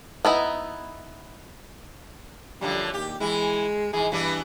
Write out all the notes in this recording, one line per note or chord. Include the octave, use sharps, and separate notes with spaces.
B3 D#4 E4
F#2 D3 F3 G3
D#2 G4
E3 G#3 E4
G#2 E3 G#4
G2 E3 B3 D4